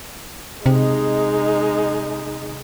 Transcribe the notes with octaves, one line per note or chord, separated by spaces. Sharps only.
C3 G#3 D#4